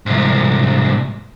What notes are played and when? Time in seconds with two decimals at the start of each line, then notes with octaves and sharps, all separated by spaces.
0.06 C2 G#2